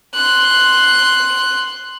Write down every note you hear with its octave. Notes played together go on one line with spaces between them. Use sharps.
C6 F#6